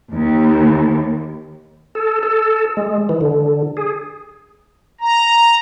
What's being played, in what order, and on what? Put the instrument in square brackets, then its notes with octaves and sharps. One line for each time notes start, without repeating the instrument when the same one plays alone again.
[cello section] D#2
[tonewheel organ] A4
A4
G#3
E3
D3
G#4
[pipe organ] A#5